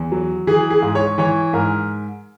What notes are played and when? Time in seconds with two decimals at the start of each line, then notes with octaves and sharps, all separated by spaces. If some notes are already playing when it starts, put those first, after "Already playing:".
Already playing: E2
0.12 F#3
0.47 E3 G#4
0.70 G#4
0.82 G#2
0.95 C#5
1.18 E3 C#5
1.53 G#2 A#4